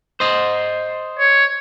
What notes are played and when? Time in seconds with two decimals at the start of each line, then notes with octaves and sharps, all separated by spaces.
0.20 C5 D#5
1.19 C#5